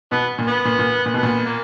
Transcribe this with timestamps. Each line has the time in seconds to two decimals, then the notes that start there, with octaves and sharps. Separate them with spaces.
0.12 B2 B3
0.38 A#2
0.48 B3
0.65 A#2
0.79 A#2
1.06 A#2
1.14 B2
1.18 B3
1.23 A#2
1.46 A#3